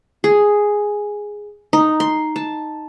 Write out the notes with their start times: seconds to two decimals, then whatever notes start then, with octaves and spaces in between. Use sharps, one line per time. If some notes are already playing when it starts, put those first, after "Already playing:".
0.24 G#4
1.73 D#4
2.00 C6
2.36 A5